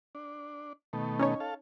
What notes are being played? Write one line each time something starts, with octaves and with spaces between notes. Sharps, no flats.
D4
B2 D#3 A3
C#4 D#4 C#5
A4 F5